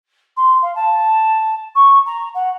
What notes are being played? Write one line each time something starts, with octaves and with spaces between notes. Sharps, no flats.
C6
F5
A5
C#6
A#5
F#5